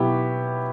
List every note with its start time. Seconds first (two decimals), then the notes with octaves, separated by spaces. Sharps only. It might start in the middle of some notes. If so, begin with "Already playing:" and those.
Already playing: B2 F#3 B3 E4 G4